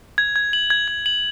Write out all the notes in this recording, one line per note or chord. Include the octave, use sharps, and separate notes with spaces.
G#6
G#6
F#7
G#6
G#6
F#7